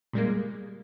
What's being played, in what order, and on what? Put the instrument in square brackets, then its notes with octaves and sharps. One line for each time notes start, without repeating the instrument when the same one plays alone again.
[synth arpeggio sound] A#2 G3 G#3 A#3